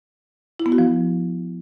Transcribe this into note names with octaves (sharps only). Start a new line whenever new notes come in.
E4
B3
F#4
F3